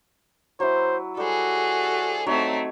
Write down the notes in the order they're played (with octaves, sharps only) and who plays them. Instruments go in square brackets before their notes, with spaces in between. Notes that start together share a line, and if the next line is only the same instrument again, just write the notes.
[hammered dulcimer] F#3 E4 [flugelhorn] C5
[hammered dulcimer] G3 C5 [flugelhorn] F#4 [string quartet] G#4 A4
[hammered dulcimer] F#3 D#4 C#5 [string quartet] A3 C4